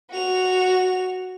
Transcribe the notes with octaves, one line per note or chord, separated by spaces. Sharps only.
F#4 F7